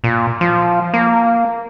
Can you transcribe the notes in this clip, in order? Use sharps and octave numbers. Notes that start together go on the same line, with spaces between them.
A#2
F3
A#3